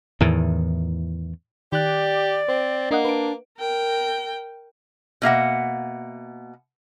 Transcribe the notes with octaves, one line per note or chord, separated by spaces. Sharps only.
E2 A2 D#3
D#3 G4 D5 F#6
C4 C5
A#3 D4 D#5 F#5
D4 B4 D7
A#4 G5
B2 A#3 E5 F#5